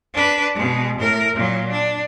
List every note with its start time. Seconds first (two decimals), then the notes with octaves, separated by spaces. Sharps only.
0.14 D4 B4
0.55 B2 G#3
0.99 A2 A#4
1.36 A#2 F#3
1.72 D4